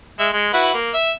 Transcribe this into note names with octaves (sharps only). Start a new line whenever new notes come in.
G#3 E5
G#3
E4 F#4 B4
A#3
E5